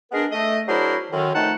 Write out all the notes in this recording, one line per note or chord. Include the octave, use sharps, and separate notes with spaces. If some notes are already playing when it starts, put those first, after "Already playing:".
G#3 B3 D4 G#4 A#4
A3 D#5
F#3 D4 E4 G#4 A#4 C5
F#2 D3 D#3
F2 D#3 A3 D#4 F#5 A5